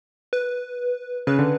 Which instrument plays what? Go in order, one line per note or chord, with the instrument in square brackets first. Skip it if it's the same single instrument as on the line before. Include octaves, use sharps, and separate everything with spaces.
[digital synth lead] B4
[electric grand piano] C#3 [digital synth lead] B4
[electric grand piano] D3